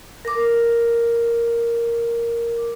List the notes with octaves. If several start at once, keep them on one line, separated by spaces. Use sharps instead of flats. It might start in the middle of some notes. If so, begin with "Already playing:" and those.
A#4 D6